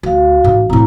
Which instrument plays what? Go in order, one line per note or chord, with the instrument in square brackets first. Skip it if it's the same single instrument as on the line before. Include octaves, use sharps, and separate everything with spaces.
[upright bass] D2 [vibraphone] F#4 F5
[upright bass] A1 G#2
[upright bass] A2 C4 [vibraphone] E4 A#5